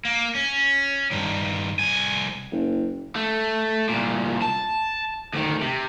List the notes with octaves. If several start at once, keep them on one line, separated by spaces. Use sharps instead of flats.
A#3
C#4
G2 D#3
C2 G#5
F#1
A3
C2 A#2
A5
D2 D#3
C3